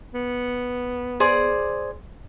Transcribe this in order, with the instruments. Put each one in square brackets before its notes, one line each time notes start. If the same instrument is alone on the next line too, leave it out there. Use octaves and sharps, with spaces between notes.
[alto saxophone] B3
[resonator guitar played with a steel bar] G#4 C5 D5